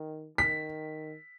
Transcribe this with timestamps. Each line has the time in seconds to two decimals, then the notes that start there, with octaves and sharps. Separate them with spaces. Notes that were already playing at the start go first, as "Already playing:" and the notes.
Already playing: D#3
0.38 D#3 B6